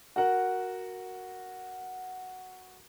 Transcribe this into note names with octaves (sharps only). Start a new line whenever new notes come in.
F#4 A#4 F#5